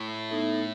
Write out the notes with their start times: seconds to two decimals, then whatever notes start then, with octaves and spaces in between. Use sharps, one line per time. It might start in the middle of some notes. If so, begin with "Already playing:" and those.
Already playing: A2
0.29 B3 D#4 A4 E5